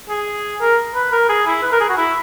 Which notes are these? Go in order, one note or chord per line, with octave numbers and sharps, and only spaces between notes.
G#4
A#4
B4
A#4
G#4
E4
B4
A#4
G#4
F#4
E4